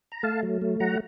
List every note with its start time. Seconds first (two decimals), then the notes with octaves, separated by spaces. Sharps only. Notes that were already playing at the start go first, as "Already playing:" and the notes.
0.12 A#5
0.23 A3 F5 A5
0.43 F#3
0.62 A3
0.80 F#3 F#5 A#5